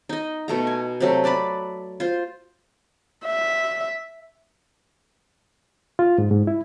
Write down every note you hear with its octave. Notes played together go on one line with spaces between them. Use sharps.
D#4 D#5
B2 A3 A#5
G#5
C3 F#3 A3
B4 D5 A5 B5
F4 C5
E5
F4
G#2
G#2
E4